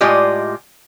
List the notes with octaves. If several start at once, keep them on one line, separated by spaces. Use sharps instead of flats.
A2 G#3 F4 G4 D5 D#5